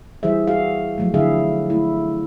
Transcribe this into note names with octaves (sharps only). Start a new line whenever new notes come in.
E3 G3 G#4 C5 E5
F#4 G#4 F5
F3 F#3 A3
D3 E4 G#4 E5 F5
A3 E4